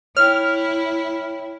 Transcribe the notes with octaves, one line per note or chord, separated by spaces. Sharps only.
E4 C#5 G5 F6